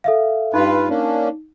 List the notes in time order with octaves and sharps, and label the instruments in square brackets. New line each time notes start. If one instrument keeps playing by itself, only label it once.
[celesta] A4 E5 F5
[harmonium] G2 F4 B4 [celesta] D#4
[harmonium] A#3 C#4 D4